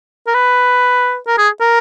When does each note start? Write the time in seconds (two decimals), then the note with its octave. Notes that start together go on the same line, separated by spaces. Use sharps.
0.27 A#4
0.34 B4
1.27 A#4
1.38 G#4
1.61 A#4